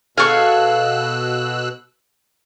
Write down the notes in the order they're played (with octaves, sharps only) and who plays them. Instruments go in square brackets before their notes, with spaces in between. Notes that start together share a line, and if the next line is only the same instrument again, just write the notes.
[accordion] B2 E6 F#6 [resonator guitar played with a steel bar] G#4 A4 [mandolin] F5 C#6